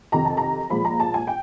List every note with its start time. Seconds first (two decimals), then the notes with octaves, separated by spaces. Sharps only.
0.12 F2 C3 D#3 A#5
0.25 A5
0.37 A#5
0.70 A#2 F3 G#3 B5
0.85 A#5
1.00 A5
1.14 G#5
1.27 G5